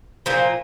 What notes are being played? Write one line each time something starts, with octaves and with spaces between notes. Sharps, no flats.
A#2 F3 A#3